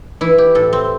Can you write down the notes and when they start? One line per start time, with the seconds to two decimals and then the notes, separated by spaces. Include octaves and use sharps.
0.21 E3 E4
0.38 G4
0.55 A2 A4
0.73 C4